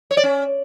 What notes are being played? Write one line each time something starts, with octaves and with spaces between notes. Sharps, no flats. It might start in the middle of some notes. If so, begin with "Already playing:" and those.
C#5
D5
C#4